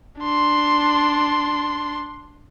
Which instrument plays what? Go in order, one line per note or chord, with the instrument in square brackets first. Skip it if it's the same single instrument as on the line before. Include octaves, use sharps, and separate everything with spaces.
[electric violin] D4 C6